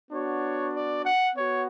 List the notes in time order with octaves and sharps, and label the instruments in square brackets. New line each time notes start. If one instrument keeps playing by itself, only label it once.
[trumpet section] B3 D4 F#4 C#5
D5
F#5
B3 F#4 C#5